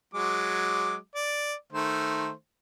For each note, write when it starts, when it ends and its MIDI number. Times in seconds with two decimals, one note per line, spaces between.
0.14 0.95 54
0.14 0.95 56
0.14 0.95 86
1.15 1.53 74
1.73 2.30 51
1.73 2.30 57
1.73 2.30 72